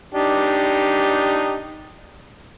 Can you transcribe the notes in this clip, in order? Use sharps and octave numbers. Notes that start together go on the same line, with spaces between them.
D4 D#4 G4